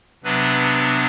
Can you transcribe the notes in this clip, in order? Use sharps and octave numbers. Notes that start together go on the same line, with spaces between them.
C3 F#3 B3 D4 B4